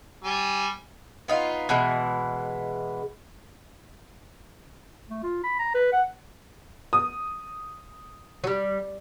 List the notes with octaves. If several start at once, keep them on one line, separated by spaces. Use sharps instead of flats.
G3 G#5
B3 D#4 F4
B2 E3 G#3
A3
F4
B5
A#5
B4
F#5
D#6
F#3 G3